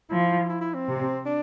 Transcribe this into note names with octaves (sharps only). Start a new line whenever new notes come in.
F3 E4
E4
E4
C4
C3
D4